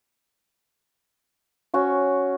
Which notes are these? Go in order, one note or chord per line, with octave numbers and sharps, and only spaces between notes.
C#4 F#4 C#6